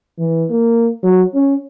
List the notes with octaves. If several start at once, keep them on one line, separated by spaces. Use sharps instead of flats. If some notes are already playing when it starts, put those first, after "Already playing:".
E3
A#3
F#3
C#4